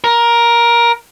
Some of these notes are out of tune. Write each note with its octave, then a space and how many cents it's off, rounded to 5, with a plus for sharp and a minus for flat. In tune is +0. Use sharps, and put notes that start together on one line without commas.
A#4 +15